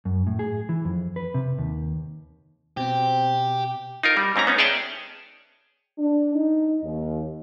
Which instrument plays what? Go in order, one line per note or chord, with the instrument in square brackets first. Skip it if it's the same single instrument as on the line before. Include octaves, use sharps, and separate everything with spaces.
[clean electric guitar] F#2
A2
G#4
E3
F2
B4
C3
D#2
[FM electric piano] B2 [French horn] C4 [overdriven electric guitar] G4
[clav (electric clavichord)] D#4 F4 A#4
G3
G#2 C4 C#4 A#5
B3 C#4 D#4
G#4 C#5 D5 E5 G5 A5
[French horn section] D4
D#4
D#2